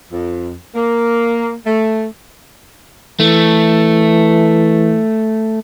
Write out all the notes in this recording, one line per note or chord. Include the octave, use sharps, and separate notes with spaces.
F2
A#3
A3
E3 A3